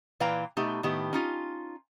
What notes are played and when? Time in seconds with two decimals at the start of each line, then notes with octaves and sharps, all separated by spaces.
0.20 A#2 E3 B4 F5 G5 A#5
0.57 B2 A3 B3 D#4 G4
0.83 A2 D#3 B3 G4
1.13 C#4 D#4 F4